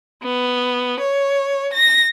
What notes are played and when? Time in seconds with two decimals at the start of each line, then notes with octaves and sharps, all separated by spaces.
0.23 B3
1.01 C#5
1.75 A#6